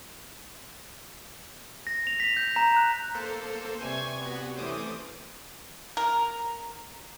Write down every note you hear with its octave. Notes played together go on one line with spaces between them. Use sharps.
A#6
F7
B6
G6
A#5
F#6
A#3 A4 C5
C3 G3 B4 C5 G#5 C#6 G#6
B3 F#4
E3 A3 C#4 C5 D6 D#6
A#4